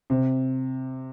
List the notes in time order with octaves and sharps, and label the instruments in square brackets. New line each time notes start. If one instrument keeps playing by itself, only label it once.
[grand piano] C3